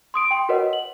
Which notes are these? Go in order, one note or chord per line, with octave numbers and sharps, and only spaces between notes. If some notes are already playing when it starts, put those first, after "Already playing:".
C6 D#6 D7
G5 C6
F#4 A#4 B4 C#5 D#5 F#5
F#7